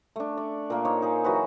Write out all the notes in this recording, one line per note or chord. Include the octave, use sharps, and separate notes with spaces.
A3 D4
D5
A#2 A#3
D#4 C5 C#5
D#4 G#4
E3 F#3 F#4 B4